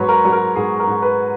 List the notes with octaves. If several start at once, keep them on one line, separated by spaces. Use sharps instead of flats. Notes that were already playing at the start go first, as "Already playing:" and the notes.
Already playing: G#2 F#3 B4 C#5
A#4
F#3
A#4
G#2 G#4
A#4
G#2
B4